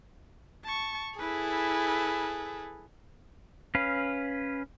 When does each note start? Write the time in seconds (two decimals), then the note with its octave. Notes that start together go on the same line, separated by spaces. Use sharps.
0.64 A5 C#6
1.19 E4 G#4 A4 B4
3.75 C#4 B4 F5